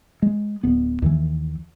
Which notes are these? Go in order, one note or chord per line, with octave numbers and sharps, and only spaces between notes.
G#3
D1 B3
D#2 D#3 E3